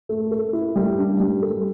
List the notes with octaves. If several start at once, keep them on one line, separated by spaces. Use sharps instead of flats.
A3
A4
E4
G3
D4
G3
A4